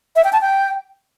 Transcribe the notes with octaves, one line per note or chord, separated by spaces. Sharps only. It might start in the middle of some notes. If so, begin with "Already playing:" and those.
E5
G5
A5
G5